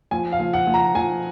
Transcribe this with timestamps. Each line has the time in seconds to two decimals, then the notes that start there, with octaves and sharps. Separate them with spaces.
0.11 F3 G#5
0.32 F5
0.39 F3
0.53 F#5
0.67 F3
0.74 A#5
0.95 F3 G#5